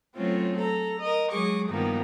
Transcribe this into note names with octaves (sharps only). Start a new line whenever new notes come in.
F#3 A3 C4 C#4 F4
A4 A#5
A#4 D#5
F#3 G#3 G#4 C#6 D6
G2 D#3 F3 A#3 B3